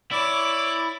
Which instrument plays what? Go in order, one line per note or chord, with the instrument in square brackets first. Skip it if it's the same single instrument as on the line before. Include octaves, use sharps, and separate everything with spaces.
[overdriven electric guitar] E4 [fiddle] C#5 D6 [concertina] D5